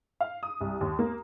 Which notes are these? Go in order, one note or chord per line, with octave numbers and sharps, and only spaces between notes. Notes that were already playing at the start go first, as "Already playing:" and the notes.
F5
D#6
C2
D#2
A#3